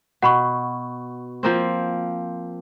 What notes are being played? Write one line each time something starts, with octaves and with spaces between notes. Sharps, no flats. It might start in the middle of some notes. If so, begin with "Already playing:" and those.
B2 F#5 B5 C#6
F3 A#3 C4